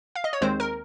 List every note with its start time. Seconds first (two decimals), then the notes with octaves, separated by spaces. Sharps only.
0.15 F5
0.24 D#5
0.33 C#5
0.41 D#2 D#3 G#3 C4 C5
0.60 A#4